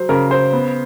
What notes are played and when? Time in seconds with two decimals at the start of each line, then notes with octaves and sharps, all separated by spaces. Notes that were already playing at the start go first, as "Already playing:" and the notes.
Already playing: F#3 C5
0.09 C#3 A#4
0.31 C5
0.53 B3